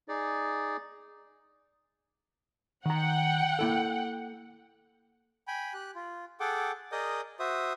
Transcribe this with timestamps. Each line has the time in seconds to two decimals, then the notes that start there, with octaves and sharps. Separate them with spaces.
0.08 D#4 G#4 D5
2.85 D#3 F#5 G5 A#5
3.59 A#3 E4 A4
5.48 G5 G#5 B5
5.73 G4 F#6
5.95 F4
6.40 G#4 A4 F#5 G5 D6
6.92 G#4 A#4 D5 D#5 D#6 G6
7.39 F#4 C5 E5 D#6